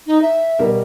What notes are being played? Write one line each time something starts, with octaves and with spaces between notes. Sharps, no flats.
D#4
E5
B2 G3 A#4